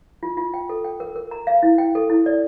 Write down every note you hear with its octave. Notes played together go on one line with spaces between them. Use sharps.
F4
F4
G5
A4
G5
A#4
A#4
A#5
F5
E4
G5
A4
E4
D5